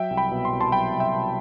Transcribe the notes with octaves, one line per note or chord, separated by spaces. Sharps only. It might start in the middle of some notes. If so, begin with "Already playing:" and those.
Already playing: F#3 E5 G5
C2
G5 B5
B2
C6
C2
A5 C6
F#3 G5 B5
C2
E5 G5
B2